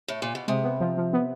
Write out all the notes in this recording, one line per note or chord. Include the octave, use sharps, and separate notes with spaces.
A2
A#2
B2
C3 G#3
B3
F3
F3
B3